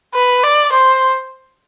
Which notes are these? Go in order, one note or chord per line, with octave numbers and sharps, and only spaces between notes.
B4
D5
C5